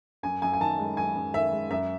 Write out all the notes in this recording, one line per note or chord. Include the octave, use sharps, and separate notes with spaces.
F#2 G#5
F#2 G#5
G#5
D#3 A5
G#3
F#2 G#5
F#2
D#3 E5
G#3
F#2 E5